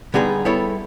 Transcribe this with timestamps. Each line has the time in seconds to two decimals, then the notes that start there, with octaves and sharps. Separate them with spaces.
0.14 D3 G3 B3 D#4 G#4
0.45 G3 B3 E4 A4 C#5